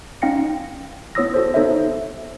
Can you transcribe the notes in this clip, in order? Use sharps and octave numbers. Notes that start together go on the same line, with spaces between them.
C#4 D#4 F5 G5 A#6 C#7
B3 E4 C#5 D#6 E6 A#6
F#4 A4 C5
B3 D#4 A4 C5 C#5 E5